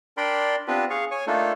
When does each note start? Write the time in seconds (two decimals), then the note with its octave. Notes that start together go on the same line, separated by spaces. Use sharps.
0.17 D4 A#4 D5 G5 B5 C6
0.68 B3 C4 D4 F4 G4 B4
0.90 G#4 F5 C#6
1.11 C#5 G#5 C#6
1.27 A3 A#3 D4 D#4 F4 A4